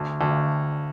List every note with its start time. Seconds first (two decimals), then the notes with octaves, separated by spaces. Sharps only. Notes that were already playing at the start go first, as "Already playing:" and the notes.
Already playing: D2
0.21 D2